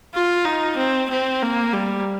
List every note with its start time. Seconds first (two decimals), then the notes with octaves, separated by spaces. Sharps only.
0.14 F4
0.45 D#4
0.77 C4
1.10 C4
1.42 A#3
1.73 G3